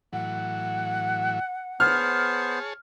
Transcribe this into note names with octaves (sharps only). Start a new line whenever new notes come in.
A2 E3 F#3 F#5
B3 G#4 C5 C#5 A5 F6